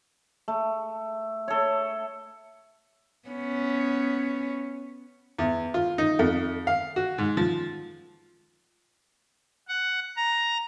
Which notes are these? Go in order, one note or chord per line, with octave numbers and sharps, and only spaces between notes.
A3
A4 C#5
B3 C#4
E2
F4
D#4
F2
F5
F#4
G#2
F3
F#5
A#5